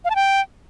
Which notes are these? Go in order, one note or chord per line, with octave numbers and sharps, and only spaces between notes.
F5
A5
G5